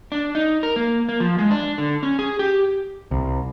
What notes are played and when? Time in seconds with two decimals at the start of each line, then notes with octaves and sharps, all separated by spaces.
0.12 D4
0.35 D#4
0.63 A#4
0.76 A#3
1.09 A#3
1.20 F3
1.38 G#3
1.51 D4
1.78 D3
2.03 C#4
2.19 G#4
2.39 G4
3.11 C2